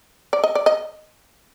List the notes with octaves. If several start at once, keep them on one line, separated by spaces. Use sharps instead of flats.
D5
D#5
D5
D#5